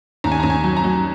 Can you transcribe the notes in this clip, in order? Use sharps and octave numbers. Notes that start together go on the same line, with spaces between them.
D#2 A#5
G#5
D#2 A#5
G#5
F#3
A#5
F#3